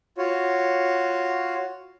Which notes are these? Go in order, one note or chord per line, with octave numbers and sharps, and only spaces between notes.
F4 F#4 C#5